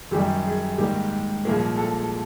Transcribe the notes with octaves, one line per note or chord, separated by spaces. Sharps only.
F#2 D#3 G3 G4
G#4
G#2 D#3 G3 A#3 G4
C2 A#2 F3 A#3 G#4
A4